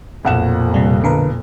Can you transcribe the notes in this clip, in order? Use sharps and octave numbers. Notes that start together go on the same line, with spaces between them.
B1 F2 A#2 F#5 E7
C3 G3
B1 D3 A#4 B4